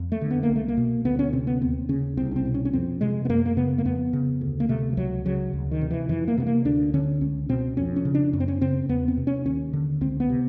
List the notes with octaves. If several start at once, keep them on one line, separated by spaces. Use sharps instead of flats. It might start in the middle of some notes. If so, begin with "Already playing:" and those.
Already playing: F2
A3
D3
B3
A#3
C2
A3
A#3
B2
D2 B3
C#4
C3 C4
B3
D#2 C4
C#3 C#4
C2 C4
C#4
C4
B2
C#4
C#4
F2 C4
C3 G#3
B3
F#2 A#3
A#3
C#3 B3
A#3
F2 B3
C#3
D2
A#3
C3 A3
F3
C#2 F#3
C#3 F#3
D2
D#3
C3
E3
F2 E3
A#3
C3 B3
A#3
D2 D4
D3 C#4
C#2 C#4
B2 C4
F2 C#4
C#4
C#3
D4
F#2 C#4
C4
C#4
C#3 C4
E2 B3
C4
C3
C#4
D#2 C#4
D3
C#2 C4
B3
C3